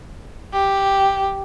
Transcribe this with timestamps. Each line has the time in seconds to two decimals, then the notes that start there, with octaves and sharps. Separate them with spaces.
0.53 G4